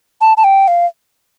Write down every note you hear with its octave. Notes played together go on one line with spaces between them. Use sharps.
A5
A5
G5
F5